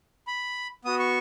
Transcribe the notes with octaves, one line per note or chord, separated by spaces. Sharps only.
B5
B3 F#4 D#6
C#6